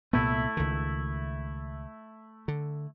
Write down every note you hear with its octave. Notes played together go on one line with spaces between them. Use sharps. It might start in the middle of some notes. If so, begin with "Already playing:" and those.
C2 A#2 A3 B3 E4
C#2 D#3
D3